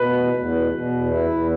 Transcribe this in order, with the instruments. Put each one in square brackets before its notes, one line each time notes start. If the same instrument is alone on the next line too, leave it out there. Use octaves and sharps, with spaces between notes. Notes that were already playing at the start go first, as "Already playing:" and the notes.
Already playing: [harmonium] B2 [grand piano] B4
[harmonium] E2
E2
B2
B2
E2
E4
E2